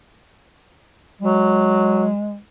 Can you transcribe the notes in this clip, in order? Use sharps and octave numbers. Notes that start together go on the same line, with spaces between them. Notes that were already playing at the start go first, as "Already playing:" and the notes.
F#3 G#3